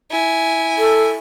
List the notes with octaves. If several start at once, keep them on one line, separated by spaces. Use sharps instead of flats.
E4 G#5
A4